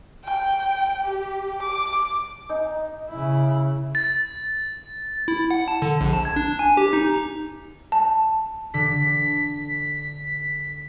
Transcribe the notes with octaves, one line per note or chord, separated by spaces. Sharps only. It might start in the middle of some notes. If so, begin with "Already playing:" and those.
G5
G4
D6
D#4
C#3 E4
A6
E4
F#5
A5
D3
A#1
A5
G#6
D4
G#5
G4
D#4
A5
D3 B6